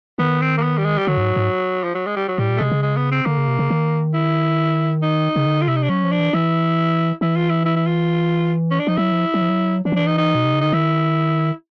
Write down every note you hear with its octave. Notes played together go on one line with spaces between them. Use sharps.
D#3 B3
C4
A#3
B3
G3
G#3
G3
D3 F#3
G2
G#2
G#2
F3
F#3
G#3
G3
F#3
A2 G3
A#2
A3
C3 G#3
C#3
G#3
B3
C4
D3 A#3
C#3
C3
C#3
D#3
E4
D#4
C#3
D3
F4
C3 E4
D#4
D4
F#3 C#4
F3
D4
E3
E3 E4
E3 E4
F4
E4
E4
E4
F4
C#4
D4
F3 D#4
F#3 E4
F3
F#3
F3
F#3
E3 D4
F3
E3 D4
D#4
D#4
B2
C3
C#3
D3 D#4
D#3 E4